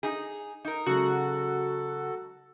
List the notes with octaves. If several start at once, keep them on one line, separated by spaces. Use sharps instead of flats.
D#4 G#4
D#4 A#4
C#3 F#3 G#3 F#4 A4